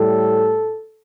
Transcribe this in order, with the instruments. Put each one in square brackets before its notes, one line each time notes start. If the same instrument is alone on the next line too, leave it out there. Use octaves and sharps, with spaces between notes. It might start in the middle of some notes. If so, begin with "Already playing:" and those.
Already playing: [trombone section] A2 G3 A4